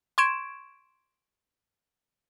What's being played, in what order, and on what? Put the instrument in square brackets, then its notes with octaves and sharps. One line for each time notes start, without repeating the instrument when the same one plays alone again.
[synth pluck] C6 C#6 G#6 D7 E7